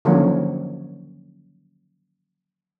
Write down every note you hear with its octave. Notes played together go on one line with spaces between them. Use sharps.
D3 D#3 F3 F#3 A#3 C#4